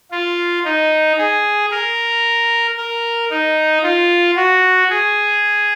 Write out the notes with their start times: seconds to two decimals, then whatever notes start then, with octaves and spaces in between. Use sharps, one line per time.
0.11 F4
0.64 D#4
1.18 G#4
1.71 A#4
2.77 A#4
3.30 D#4
3.83 F4
4.36 F#4
4.90 G#4